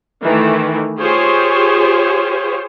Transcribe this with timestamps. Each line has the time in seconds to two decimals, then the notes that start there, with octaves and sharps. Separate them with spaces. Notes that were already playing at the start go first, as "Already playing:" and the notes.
0.23 D#3 E3 A3
0.98 F4 G4 G#4 C5 C#5